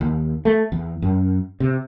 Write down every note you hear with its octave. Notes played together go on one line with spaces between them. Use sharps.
D#2
A3
E2
F#2
C3